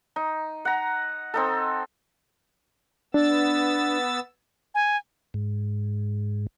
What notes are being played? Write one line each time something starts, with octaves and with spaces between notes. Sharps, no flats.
D#4
F#5 A#5
C4 D#4 A4
B3 D4 E6 A6
G#5
G#2